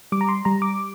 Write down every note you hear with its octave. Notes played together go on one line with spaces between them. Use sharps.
G3 D6
A#5
C6
G3 A#5
D6